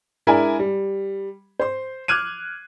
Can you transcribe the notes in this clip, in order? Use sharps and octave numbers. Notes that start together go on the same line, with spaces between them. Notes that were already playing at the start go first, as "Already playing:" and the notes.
G#3 D4 E4 A#4 D5 G#5
G3
C5 C6
D6 F6 F#6 G#6 D#7